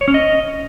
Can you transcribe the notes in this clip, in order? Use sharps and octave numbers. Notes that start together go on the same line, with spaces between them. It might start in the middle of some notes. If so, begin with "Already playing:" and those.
C#5
C#4
D#5